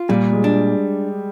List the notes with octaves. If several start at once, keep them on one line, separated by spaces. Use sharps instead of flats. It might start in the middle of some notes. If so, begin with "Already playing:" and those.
Already playing: F4
A#2 G3
G#3
D4